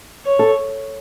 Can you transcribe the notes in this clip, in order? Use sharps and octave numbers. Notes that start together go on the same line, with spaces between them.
C#5
A4